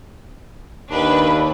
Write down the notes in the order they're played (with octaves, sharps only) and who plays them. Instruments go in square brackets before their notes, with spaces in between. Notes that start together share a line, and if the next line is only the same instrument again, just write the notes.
[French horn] D#2 [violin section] D4 B4